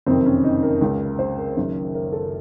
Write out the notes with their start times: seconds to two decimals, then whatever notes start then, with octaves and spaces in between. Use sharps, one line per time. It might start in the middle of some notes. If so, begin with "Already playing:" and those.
0.06 F#1 F2 C3 D#3 C4
0.26 C#4
0.44 D#4
0.63 A#4
0.81 C#2 C#3
1.19 C5
1.38 A#4
1.57 F#1 F#2 D#3
1.94 A#4
2.12 A4